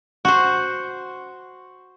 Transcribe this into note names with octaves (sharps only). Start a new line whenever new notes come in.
F#4 C5